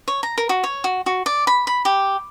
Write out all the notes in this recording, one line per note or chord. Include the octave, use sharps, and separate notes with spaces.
C#5
A#5
A#4
F#4
C#5
F#4
F#4
D5
B5
B5
G4